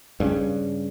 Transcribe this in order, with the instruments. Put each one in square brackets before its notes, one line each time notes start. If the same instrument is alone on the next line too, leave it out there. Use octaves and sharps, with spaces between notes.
[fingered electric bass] G2 C#3